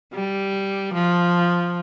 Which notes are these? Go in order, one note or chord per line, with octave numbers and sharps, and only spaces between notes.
G3
F3